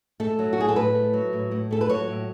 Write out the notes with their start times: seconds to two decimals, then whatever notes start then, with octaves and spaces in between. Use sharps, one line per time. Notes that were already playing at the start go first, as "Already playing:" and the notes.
0.20 A3 A4
0.39 F#3
0.53 F#4
0.58 A2 G#4
0.69 A4
0.76 A2 B4
0.95 A3
1.13 F#3
1.33 A2
1.51 A2
1.71 A3 A4
1.81 B4
1.89 F#3 C#5
2.08 A2